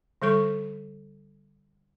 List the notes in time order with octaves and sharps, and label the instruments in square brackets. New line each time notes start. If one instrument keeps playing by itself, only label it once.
[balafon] D3 G3 A4 C#6